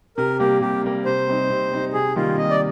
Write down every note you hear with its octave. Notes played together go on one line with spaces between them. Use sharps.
C3 A#4
G3 A#3 G4
C3 G4
G3 A#3
C3 C5
G3 C4 D#4
C3
G3 C4 D#4
C3 G#4
D#3 G3 A#3 D#4 F4
C3 D#5
D5